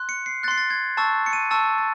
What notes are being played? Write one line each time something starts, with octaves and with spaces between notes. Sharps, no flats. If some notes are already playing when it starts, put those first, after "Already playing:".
Already playing: C6 F#6
C#7
C7
C6 F#6 A6 C7
A6
G#6
A5 C#6 E6 A6
C#7
D#7
A5 C#6 E6 A6
A6